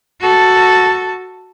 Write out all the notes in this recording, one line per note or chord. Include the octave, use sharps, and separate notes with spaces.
F#4 A4